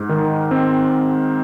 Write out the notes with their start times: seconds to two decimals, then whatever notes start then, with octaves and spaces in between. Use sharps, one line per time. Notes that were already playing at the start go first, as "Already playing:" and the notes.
Already playing: G#2
0.09 D#3
0.51 C4